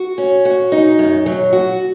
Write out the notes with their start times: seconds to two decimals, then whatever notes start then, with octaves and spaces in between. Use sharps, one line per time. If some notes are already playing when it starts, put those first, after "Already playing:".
Already playing: F#4
0.18 C#4
0.45 F#4
0.72 D#4
0.99 F#2
1.26 F#3
1.53 F#4